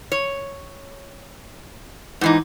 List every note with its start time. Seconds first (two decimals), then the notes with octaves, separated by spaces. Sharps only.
0.12 C#5
2.21 G#2 E3 D#4